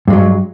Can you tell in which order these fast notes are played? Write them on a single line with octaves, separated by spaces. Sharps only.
G2 G#3 F#3